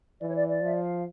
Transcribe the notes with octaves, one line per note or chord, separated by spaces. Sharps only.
E3 D5
C#5
D5
D5
F3 E5
F5